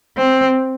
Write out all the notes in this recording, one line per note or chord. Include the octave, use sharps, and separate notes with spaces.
C4